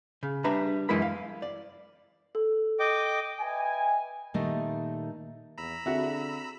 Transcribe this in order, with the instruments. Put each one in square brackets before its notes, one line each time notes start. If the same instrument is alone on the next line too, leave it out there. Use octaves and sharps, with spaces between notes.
[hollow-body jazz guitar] C#3
G3 D4 B4 E5 A#5 B5
F#2 E3 G#3 E4 A#4 B5
F5
D5
[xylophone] A4
[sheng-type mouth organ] D#5 G5 D6
[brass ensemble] B4 D#5 E5 G5 G#5
[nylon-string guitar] A#2 D#3 G3 A3 D#4 D#5
[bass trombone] E2 [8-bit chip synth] A#5 B5 E6
[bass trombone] D3 [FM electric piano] C4 G#4 [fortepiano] E4 F#4